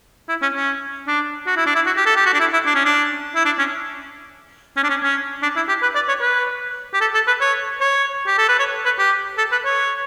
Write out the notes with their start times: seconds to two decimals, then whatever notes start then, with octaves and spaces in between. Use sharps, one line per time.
0.29 E4
0.42 C#4
0.54 C#4
1.07 D4
1.47 F#4
1.56 E4
1.66 D4
1.75 E4
1.86 F#4
1.97 G4
2.06 A4
2.16 G4
2.26 F#4
2.34 D4
2.40 E4
2.53 E4
2.66 D4
2.75 C#4
2.85 D4
3.35 E4
3.45 D4
3.59 C#4
4.76 C#4
4.83 D4
4.89 C#4
5.03 C#4
5.42 D4
5.56 E4
5.68 G4
5.82 B4
5.95 D5
6.08 C#5
6.21 B4
6.93 G4
7.01 A4
7.14 A4
7.27 B4
7.41 C#5
7.80 C#5
8.27 G4
8.38 A4
8.48 B4
8.59 C#5
8.85 B4
8.99 G4
9.38 A4
9.52 B4
9.65 C#5